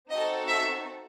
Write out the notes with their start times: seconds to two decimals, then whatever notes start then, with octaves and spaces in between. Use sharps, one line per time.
0.11 C4 D#4 F#4 A4 D#5
0.48 E5